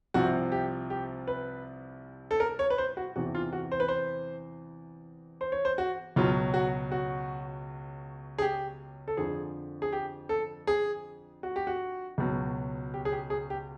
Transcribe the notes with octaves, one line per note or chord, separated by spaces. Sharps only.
C2 C3 F3 F#4
G4
G4
B4
A4
A#4
C#5
B4
C5
F#4
E2 C3 E3 F#4
F4
F#4
C5
B4
C5
C5
C#5
C5
F#4
C#2 B2 F#3 F4
F#4
F#4
G#4
G4
A4
F2 D3 F3 G#4
G#4
G4
A4
G#4
F#4
G4
F#4
C#2 B2 F#3
G4
G#4
G4
G#4
G4